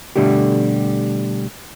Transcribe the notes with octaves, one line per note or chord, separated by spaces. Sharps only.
B2 D3 G3 A3 G4